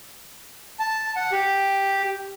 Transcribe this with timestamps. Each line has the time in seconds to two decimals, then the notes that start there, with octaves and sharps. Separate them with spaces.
0.80 A5
1.16 F#5
1.32 G4